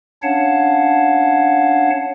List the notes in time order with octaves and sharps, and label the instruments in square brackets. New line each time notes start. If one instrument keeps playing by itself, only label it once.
[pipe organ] C#4 D4 C#5 F5 F#5 A5